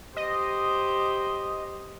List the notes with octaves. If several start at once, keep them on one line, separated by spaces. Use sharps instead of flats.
G4 C5 D#5